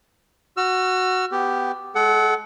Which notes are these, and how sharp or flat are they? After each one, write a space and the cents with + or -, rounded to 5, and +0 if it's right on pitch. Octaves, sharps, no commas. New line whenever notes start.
F#4 +0 E6 +40
B3 +15 G4 +0
G#3 +10 A4 -35 F#5 +15